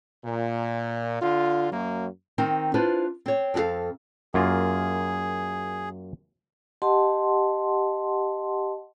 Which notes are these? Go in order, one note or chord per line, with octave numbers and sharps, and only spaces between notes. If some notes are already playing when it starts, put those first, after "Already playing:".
A#2
D3 F4
F#2 F#3 A#3
D#3 C4 D#4
D4 E4 F4 B4 C5
C4 C#5
F2 C4 F#4 A4 F5
F#2 A#3 F4 G#4
G4 D#5 F#5 A5 C6